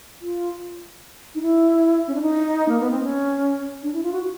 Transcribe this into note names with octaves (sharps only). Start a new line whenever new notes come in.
F4
D#4
E4
C#4
D4
D#4
A#3
B3
C4
C#4
D4
E4
F4
F#4